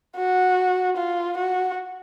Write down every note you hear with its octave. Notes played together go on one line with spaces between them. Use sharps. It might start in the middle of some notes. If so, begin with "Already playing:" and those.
F#4
F4
F#4